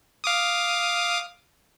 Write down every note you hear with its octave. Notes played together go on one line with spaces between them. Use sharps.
F5 D6 D#6